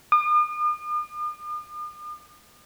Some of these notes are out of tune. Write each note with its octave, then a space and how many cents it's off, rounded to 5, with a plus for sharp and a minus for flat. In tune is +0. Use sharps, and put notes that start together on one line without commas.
D#6 -45